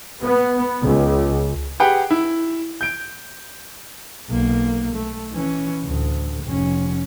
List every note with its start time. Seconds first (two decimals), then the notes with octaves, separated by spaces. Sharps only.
0.23 B3
0.81 C#2
1.80 G4 G#4 B4 F#5 G5
2.11 E4
2.81 G6 D7
4.30 B1 A#3
4.95 A3
5.33 E3 C#4
5.85 D2 A2
6.45 F1 C#4